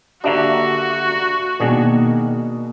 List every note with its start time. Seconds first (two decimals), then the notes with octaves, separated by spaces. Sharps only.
0.24 D3 A#3 D4 F#4 G4 E5 A#5
1.60 B2 D#3 A#3 D4 G#4